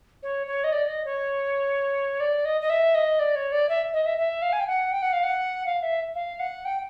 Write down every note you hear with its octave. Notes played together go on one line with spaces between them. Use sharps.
C#5
C#5
D#5
D5
D#5
C#5
D5
D#5
D#5
E5
D#5
D5
C#5
D5
E5
D#5
E5
E5
F5
G#5
G5
F#5
G5
F#5
F5
F#5
F5
E5
F5
F#5
G5